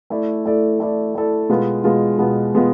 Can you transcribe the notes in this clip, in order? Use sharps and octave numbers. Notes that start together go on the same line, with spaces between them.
A3 E4 A4 D5
A3 E4 A4 D5
A3 E4 A4 D5
A3 E4 A4 D5
B2 G#3 B3 F4
B2 G#3 B3 F4
B2 G#3 B3 F4
B2 G#3 B3 F4